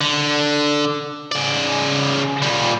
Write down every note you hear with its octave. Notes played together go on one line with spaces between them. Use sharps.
D3
C#3 D5
A#2 G3